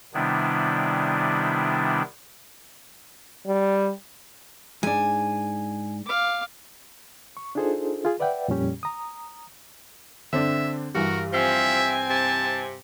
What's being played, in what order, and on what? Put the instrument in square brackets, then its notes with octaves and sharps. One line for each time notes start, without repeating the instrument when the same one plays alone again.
[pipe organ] C3 D#3 G3 B3 D4 E4
[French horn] G3
[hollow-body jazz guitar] G#2 D4 [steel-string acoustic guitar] G#5
[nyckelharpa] F5 D6
[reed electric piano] C#6
D4 D#4 F4 G#4 A4 C5
F4 G#4
B4 D5 E5 F#5 G5
F2 A#2 G3 C#4 G4
A#5 D#6
[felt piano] D3 C4 D4 [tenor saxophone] E5
[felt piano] G2 E3 [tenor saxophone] F#4 [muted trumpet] A#4
[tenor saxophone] F3 [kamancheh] C4 G#5 [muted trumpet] E5
[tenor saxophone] C3 [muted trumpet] A5